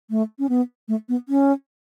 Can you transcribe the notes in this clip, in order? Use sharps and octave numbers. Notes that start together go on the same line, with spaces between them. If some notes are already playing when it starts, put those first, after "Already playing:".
A3
C#4
B3
A3
B3
C#4